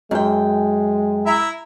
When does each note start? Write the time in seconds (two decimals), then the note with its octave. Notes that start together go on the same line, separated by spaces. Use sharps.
0.11 F#2 G#3 G5
1.26 E4 E5 A#5